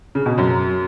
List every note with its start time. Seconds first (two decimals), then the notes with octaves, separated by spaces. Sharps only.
0.15 C#3
0.26 B2
0.37 F#2 F#3